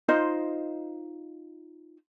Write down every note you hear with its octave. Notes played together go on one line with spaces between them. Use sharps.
D#4 F4 C5 D#5